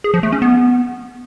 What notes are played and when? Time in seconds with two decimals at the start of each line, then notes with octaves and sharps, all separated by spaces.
0.04 G#4
0.14 F3
0.23 A3
0.32 C#4
0.42 B3